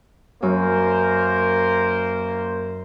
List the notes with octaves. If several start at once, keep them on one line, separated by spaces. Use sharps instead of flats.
F#2 A#3 A#4 C5